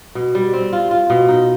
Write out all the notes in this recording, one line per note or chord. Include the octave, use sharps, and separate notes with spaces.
B2
G3
C4
F4
F4
B2
D#4